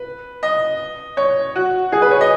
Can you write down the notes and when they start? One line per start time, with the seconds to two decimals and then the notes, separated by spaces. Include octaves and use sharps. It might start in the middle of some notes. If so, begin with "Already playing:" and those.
Already playing: B4
0.43 D#5
1.17 C#5
1.56 F#4
1.92 G#4
2.02 B4
2.11 C#5
2.21 D#5